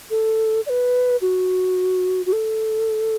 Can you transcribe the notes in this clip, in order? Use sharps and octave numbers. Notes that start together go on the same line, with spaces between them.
A4
D5
B4
F#4
F#4
A4